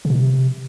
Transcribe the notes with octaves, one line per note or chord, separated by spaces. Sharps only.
C#3
B2
C3